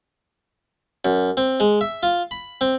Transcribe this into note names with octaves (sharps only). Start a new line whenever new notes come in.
F#2
C4
G#3
E5
F4
B5
C4